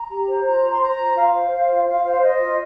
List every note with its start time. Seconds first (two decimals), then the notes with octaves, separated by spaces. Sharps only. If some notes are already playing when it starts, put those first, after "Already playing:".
Already playing: A#5
0.09 G4
0.27 C5
0.44 F4 A#5
0.62 C5
0.72 C6
0.80 C5 A#5
0.98 F4
1.15 F4 F5
1.33 C5
1.51 C5
1.68 F4
1.86 F4 F5
2.04 C5 F5
2.22 C5 D#5
2.39 F4